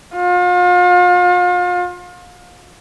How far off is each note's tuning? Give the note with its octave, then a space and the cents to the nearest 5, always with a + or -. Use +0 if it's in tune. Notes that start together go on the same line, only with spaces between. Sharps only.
F4 +40